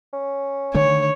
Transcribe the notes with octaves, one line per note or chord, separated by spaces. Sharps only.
C#4
D3 D#3 A3 C#5